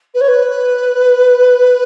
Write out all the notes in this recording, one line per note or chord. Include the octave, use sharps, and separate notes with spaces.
B4
C#5
B4